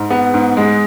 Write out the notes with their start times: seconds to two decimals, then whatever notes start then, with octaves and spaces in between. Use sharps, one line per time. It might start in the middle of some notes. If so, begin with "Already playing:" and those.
Already playing: G#2
0.10 B3
0.34 G#2
0.57 G#3